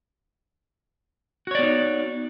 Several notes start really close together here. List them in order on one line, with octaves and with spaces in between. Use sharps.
F#4 C#5 D5 B3 D#4